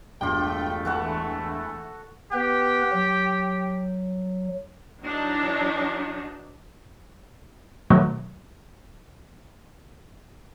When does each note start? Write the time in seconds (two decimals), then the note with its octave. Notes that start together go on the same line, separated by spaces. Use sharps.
0.21 E1 G2 A3 F4 G4 G5
0.85 E3 F#4 A4 F#5
2.33 B3 G4 B4
2.92 F#3
5.03 E3 F#3 D4 D#4
7.90 B2 D#3 F#3 A3